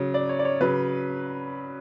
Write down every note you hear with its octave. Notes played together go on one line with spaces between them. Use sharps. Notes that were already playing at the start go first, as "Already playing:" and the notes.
Already playing: C#3 F#3
D5
C#5
D5
C#5
C#3 F#3 B4